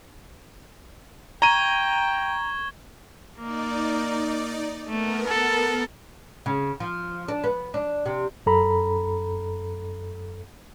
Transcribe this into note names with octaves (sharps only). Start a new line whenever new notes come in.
G5 A#5 C#6 G#6 D#7 G7
A#3 D#4 D5
A3 B3 A#4
A4
C#3
F3
D4
B3
D4
C3
F#2 A4 A#5 B5